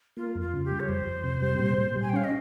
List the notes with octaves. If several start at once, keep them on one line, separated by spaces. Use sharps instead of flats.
A#3 F4
F2
F4
C#3
G4
G3
C#5
F2 C5
F2
C3
G3
A#2
A#2
G3
G#5
G5
C#4 F5
D#5